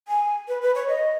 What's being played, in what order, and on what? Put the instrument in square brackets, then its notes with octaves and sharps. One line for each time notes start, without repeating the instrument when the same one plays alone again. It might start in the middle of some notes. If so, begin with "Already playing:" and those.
[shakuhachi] G#5
B4
B4
C#5
D#5